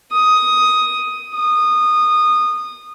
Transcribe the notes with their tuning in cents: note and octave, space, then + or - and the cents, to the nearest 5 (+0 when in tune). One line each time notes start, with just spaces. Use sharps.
D#6 +5
D#6 -20